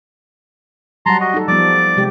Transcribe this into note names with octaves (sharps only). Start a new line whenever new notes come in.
F#3 G3 F#5 A5 A#5 C6
F#4 D#5
D#4 A4
F3 G3 B3 D5 D6
C3 G#3 G4